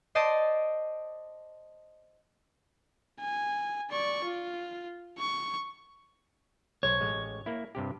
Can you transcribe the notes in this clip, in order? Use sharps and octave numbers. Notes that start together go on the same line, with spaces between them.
C5 D5 D#5 A5 D#6
G#5
D5 C#6
F4
C#6
B1 C5 C#5
A1 G#3
A#3 E4
G2 C3 G4